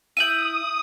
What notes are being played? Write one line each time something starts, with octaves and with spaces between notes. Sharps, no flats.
E4 E5 D#6 G6 D#7 F#7